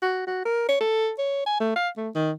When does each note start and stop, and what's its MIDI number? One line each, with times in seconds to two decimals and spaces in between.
0.03 0.23 66
0.27 0.43 66
0.46 0.68 70
0.69 0.76 73
0.81 1.12 69
1.19 1.46 73
1.46 1.56 80
1.61 1.73 57
1.76 1.89 77
1.97 2.10 57
2.15 2.32 51